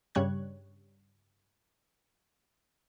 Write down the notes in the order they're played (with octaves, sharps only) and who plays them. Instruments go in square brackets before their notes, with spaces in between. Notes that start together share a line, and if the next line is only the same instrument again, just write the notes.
[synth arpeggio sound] G2 C#3 G3 C#5 F#6 G#6